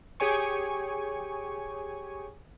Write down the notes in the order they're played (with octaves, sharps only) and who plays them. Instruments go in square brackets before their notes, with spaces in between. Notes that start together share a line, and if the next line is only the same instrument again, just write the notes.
[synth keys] G4 G#4 C#5 G#5 C#6